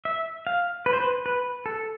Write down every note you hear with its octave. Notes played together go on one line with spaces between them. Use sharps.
E5
F5
B4
C5
B4
B4
A4